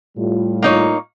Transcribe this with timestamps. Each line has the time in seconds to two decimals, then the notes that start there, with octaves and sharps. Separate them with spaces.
0.17 A2 G3 F4
0.62 A#3 D#4 C#5